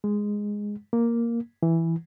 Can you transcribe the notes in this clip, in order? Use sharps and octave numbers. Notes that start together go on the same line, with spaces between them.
G#3
A#3
E3